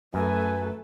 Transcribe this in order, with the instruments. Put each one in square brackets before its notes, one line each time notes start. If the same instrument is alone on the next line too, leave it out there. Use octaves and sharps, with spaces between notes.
[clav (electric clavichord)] F#2 [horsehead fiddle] A3 A4 [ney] B4 [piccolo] G#5